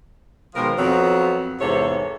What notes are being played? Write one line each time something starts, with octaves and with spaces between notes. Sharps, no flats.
B2 D#3 F3 G#3 A#4
F2 F3 F#3 B3 C4
E2 G#2 C3 E3 A4 C#5